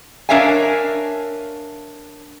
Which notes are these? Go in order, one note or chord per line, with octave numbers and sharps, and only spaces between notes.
D4 A#4 C#5 E5 F5 G#5